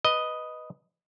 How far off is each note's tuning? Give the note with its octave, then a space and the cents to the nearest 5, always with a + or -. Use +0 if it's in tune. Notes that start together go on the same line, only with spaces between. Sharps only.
B4 +0 D#5 +0